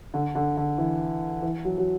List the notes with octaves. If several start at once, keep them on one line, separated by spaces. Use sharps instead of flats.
D3
D3
D3
E3
E3
F#3
F#3